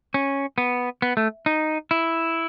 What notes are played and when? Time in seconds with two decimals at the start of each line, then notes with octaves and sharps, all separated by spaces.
0.14 C#4
0.58 B3
1.02 B3
1.17 A3
1.46 D#4
1.91 E4